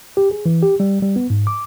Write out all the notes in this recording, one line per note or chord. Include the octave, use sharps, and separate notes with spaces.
G4
G#4
E3
G4
G3
G3
B3
G#2
D6